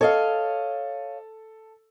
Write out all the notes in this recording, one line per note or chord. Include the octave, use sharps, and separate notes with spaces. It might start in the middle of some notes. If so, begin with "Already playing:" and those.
A4 C#5 D#5 F5